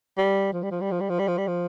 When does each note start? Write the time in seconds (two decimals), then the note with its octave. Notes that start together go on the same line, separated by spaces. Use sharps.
0.18 G3
0.53 F3
0.63 G3
0.71 F3
0.81 G3
0.92 F3
1.01 G3
1.10 F3
1.19 G3
1.28 F3
1.38 G3
1.48 F3